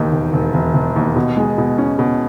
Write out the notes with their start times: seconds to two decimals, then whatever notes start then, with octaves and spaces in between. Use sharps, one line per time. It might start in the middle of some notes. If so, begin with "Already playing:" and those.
Already playing: E1 D#2 D#3
0.13 E1
0.33 E1
0.54 E1
0.74 E1
0.96 D#2
1.16 B2
1.37 G#3
1.58 B2
1.78 C#4
1.99 B2